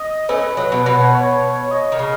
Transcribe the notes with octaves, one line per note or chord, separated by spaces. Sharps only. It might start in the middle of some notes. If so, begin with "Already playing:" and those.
Already playing: D#5
A3 C#4 B4
F#3
B2
B2 B4
C#5
B4
C#5
D#5
D#3
C#3